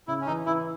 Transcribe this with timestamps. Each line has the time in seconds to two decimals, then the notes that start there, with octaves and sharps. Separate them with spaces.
0.08 C#3 E4
0.21 C#4
0.27 E3 D#4
0.46 E3 E4